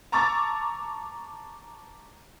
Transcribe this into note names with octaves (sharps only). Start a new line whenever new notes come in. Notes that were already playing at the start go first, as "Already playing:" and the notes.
A5 A#5 C#6 D6 E6 A6